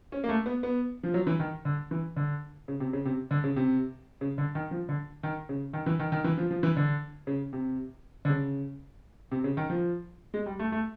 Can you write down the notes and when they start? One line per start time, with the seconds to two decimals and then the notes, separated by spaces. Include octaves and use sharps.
0.12 C#4
0.24 A#3
0.29 A3
0.46 B3
0.63 B3
1.04 F3
1.14 F#3
1.27 E3
1.40 D#3
1.65 D3
1.91 E3
2.16 D3
2.68 C#3
2.80 C3
2.93 C#3
3.05 C3
3.31 D3
3.44 C#3
3.56 C3
4.21 C#3
4.38 D3
4.55 D#3
4.71 F3
4.89 D3
5.23 D#3
5.49 C#3
5.73 D#3
5.86 E3
5.99 D#3
6.12 D#3
6.24 E3
6.38 F3
6.51 F3
6.63 E3
6.77 D3
7.27 C#3
7.53 C3
8.25 D3
8.29 C#3
9.31 C3
9.44 C#3
9.57 D#3
9.70 F3
10.34 G#3
10.46 G3
10.59 A3
10.72 A3